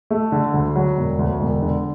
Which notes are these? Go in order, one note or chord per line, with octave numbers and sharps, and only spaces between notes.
A3
D3
D2
F#3
E1
D2
E1
D3